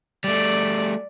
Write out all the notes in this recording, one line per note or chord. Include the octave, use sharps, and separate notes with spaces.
G3 A3 D5